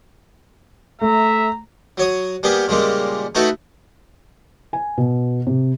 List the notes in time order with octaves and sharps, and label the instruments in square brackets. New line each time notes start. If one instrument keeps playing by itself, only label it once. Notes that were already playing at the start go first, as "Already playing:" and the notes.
[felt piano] A3 [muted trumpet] E5 [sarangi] A#5
[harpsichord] F#3 C#5 D#6
G3 A#3 B3 G4 G#4
A#2 C#3 G3 G#3 A#3
A3 D#4 E4 F#4 A4 B4
[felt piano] G#5
B2
C3